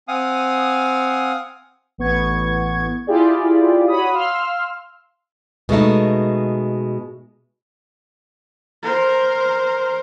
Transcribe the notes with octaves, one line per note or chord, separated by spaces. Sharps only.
C4 F5 F#5 G#5 D#6
A1 B3 C#6 G#6
E4 F4 G4 G#4 D5
F#4 C#5 B5 D#6
F5 C6 E6 F6
B2 G#3 A3 D#4
A#4 C5